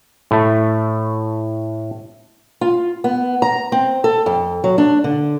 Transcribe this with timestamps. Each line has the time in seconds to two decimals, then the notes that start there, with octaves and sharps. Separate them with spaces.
0.31 A2 A3
2.61 F4
3.04 B3
3.42 A#5
3.72 C4
4.04 A4
4.26 F2
4.64 F#3
4.78 D4
5.04 D3